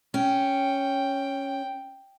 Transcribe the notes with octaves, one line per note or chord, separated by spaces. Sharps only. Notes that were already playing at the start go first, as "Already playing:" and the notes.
C#4 G5